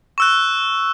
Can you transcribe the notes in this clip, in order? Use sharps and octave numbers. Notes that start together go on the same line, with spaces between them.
C#6 E6 F#6